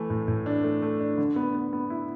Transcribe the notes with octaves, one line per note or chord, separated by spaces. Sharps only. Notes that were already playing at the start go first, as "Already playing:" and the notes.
Already playing: E3 A3
A2
A2
D4
A3
A3
D4
D3
B3
B3
B3
E4